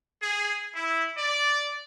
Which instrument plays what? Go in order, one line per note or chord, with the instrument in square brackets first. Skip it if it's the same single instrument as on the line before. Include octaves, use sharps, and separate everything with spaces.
[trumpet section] G#4
E4
D5